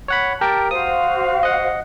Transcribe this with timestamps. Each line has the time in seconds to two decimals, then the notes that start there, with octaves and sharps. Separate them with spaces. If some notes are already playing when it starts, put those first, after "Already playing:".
0.08 C#5 F#5 B5
0.41 G4 A#4 G5 A5
0.71 F#4 C5 F5 D#6
1.43 D#5 F#5